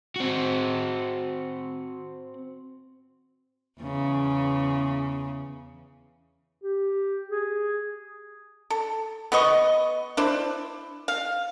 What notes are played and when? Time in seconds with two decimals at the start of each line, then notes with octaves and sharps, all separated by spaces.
0.16 C4 F#4
3.81 E2 C#3
6.63 G4
7.30 G#4
8.70 A4
9.32 B3 B4 D#5 C#6
10.17 D4 E4 C5
11.08 F5